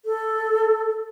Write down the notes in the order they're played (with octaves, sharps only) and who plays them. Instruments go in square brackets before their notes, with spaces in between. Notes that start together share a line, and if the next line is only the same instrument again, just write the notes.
[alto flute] A4